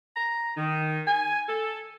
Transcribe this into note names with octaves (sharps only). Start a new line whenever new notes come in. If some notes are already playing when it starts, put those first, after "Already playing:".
A#5
D#3
G#5
A4